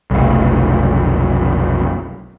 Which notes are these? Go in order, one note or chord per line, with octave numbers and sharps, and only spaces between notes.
F1 B1